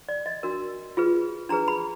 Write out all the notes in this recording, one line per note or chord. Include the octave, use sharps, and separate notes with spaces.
D5
D#5
D4 F#4 A#4
F4 G#4 B4
D4 G#4 B4 A#5
B5